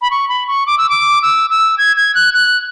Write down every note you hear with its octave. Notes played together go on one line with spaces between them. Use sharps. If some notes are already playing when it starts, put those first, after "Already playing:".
B5
C#6
B5
C#6
D6
E6
D6
E6
E6
G#6
G#6
F#6
F#6